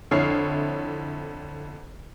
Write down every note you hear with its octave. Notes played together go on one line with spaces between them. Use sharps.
F2 D3 E4 C#5 F6 C7